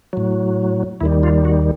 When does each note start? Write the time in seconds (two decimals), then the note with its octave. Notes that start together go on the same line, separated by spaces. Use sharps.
0.13 A2 F#3
1.01 D#2 D#3 G3 E4
1.23 F4
1.45 F#4